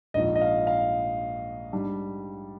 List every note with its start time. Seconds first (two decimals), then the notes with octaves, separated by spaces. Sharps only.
0.14 A#1 G#2 F3 D#5
0.35 D#5
0.41 F5
0.67 F5
1.72 G#2 G3 D4